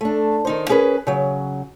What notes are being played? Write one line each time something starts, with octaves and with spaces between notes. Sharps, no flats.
A3 D4
D#3 D#4 C5
C#4 G#4 A#4 B4
C#3 F#3